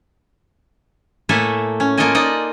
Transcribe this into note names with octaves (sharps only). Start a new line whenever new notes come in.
A2 A3 A#3 A4 E5 G#5
C#4
A#3 F4 A4 A#4 D#5 G#5
D#4 F4 D5 D#5